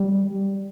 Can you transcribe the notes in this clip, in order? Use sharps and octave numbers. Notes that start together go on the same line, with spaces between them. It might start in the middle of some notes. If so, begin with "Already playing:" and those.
Already playing: G3